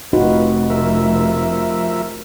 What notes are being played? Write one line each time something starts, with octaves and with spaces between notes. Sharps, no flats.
F1 D#4 F4 F#4 B4
F3 A#4 E5